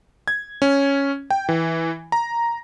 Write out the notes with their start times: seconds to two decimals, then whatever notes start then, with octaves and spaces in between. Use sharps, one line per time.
0.28 G#6
0.62 C#4
1.30 G5
1.49 E3
2.12 A#5